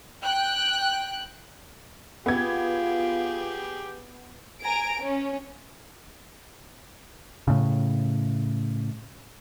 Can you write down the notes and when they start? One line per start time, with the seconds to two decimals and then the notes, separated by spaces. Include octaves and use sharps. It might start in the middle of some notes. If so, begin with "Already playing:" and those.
0.24 G5 F#6
2.26 B3 F4 G4 G#4 G#6
4.63 G#5 A#5 D7
5.01 C#4
7.48 A2 C#3